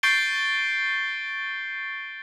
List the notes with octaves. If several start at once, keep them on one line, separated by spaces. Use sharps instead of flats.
C#6 G6 A6 C7 D7 G7